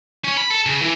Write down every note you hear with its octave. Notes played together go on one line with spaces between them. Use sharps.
C#4
B5
A4
C#3
E3